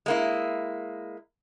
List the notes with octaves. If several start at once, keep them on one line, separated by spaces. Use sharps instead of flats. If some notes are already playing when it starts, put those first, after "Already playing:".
G#3 A#3 E4